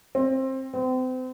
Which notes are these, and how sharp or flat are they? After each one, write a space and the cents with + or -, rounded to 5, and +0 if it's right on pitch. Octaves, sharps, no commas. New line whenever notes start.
C4 +20
C4 -35